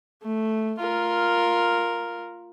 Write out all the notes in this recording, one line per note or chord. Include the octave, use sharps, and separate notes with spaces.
A3
F4 A#4